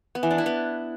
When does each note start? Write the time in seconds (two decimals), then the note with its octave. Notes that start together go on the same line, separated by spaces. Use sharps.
0.15 B3
0.23 E3
0.31 D4
0.38 E4
0.46 B3